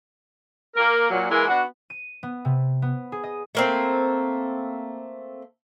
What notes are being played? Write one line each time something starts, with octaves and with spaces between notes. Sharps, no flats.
A#3 A#4
A#2 F#3
E3 G#3 A#3 E4 A#4
B3 D4 F#4
D#7
B3
C3
B3
G#4
D#5
A3 A#3 C4